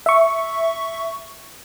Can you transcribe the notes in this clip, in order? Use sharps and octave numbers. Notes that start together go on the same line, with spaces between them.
E5 C#6